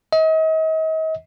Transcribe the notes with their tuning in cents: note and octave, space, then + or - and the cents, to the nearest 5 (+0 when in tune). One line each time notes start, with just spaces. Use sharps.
D#5 +40